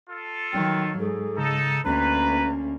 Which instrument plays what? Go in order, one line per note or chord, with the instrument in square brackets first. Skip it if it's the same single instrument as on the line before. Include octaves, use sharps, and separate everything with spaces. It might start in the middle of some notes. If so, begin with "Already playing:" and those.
[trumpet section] F4 A4
[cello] D#3 F#3 [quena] G5
[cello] G#2 [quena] G#4 [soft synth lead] A4
[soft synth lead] C#3 [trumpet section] D#4 A4
[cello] D2 A#3 [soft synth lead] C#4 [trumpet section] B4 [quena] A#5